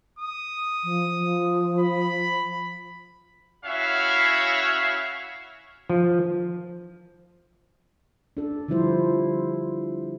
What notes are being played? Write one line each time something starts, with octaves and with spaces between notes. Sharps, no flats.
D#6
F3
F3
B5
C#4 E4 F#4 C#5 E5 F5
F3
D4 A4
D3 F3 G3 E4 C5